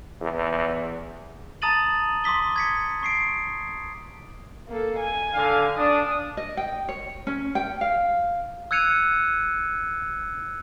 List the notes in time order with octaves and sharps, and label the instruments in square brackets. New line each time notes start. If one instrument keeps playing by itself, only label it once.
[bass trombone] E2
[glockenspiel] A5 A#5 D#6 A6 D#7 F#7
C6 D6 D#6 B6 G7
G#6 B6 C#7
C#6 C7 D7
[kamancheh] A#3 A4
G#5
[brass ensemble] D3 D4 F5
[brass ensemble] D4 [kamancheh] D#6
[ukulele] D#5
G5
C#5
C#4
G5
F5
[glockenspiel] E6 F#6 G#6 C#7 D#7 F7